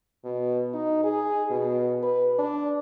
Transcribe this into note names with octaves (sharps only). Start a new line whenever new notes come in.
B2
D#4
G#4
B2
B4
D4